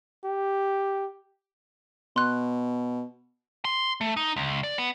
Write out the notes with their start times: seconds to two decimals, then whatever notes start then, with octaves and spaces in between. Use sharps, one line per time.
0.25 G4
2.16 B2 C6 F#6
3.65 C6
4.01 A3
4.17 D#4
4.36 C#2
4.63 D5
4.78 B3